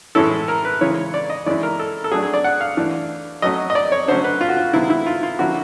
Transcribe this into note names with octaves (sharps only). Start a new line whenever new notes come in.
A2 E3 G#3 C#4 E4 A4
A#4
B4
C#3 E3 G#3 C#5
D5
D#5
E3 G#3 C#4 E4 D5
A#4
A4
A4
F#3 A3 D4 G#4
G#4
D5
F#5
F5
E3 A3 D4
F#3 A3 C#4 D#5
D#5
D5
C#5
D3 F#3 A3 C#4 C5
B4
F4
F#4
F4
C3 D#3 G#3 B3 E4
E4
F4
F4
D3 F3 A#3 C#4 E4 F#4